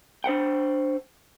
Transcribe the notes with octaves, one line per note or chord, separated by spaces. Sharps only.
D4 C5 F#5 G5